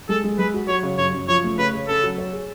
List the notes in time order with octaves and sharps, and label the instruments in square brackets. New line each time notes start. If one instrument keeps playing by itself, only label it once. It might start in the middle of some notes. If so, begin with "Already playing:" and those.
[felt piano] G#3 [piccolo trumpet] A4
[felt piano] G#3
[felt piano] G#3 [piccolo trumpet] B4
[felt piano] F#4
[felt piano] F#3 [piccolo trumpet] C#5
[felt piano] C#3
[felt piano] F#2 [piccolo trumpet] C#5
[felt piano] F#2
[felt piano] F3 [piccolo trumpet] C#5
[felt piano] A3
[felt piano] C#3 [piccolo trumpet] B4
[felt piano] C#3
[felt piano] C#4 [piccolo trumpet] A4
[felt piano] F#3
C#5
G#4